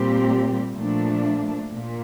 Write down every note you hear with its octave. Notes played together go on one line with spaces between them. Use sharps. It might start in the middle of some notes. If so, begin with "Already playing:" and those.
Already playing: A#2 G3 C4 G4
A#2 F3 A3 D4
A#2